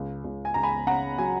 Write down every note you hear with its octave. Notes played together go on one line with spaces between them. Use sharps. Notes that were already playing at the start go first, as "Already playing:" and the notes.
Already playing: C#2
C#2
G#5
C#2 A#5
G#5 B5
C#3 F#5 A#5
F#3 G#5